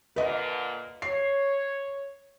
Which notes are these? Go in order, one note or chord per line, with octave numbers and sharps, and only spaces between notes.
A#2 D3 B4 D#5
C#5 C7